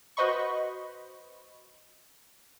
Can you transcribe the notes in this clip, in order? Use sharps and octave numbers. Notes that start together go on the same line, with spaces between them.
F#4 B4 C5 D#5 B5 C#6